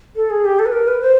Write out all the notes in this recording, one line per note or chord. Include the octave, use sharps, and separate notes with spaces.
A4
G#4
G4
A4
B4
A#4
B4
C5